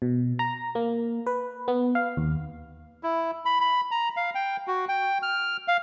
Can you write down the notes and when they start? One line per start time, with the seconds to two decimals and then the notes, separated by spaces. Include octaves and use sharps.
0.02 B2
0.39 A#5
0.75 A#3
1.26 B4
1.68 B3
1.95 F5
2.17 D#2
3.03 E4
3.45 B5
3.61 B5
3.91 A#5
4.17 F5
4.35 G5
4.67 F#4
4.89 G5
5.23 F6
5.68 F5